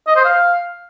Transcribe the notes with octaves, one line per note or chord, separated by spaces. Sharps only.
D#5
C5
F5